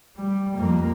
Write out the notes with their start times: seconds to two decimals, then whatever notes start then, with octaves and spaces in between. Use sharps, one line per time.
0.17 G3
0.57 F2 A#3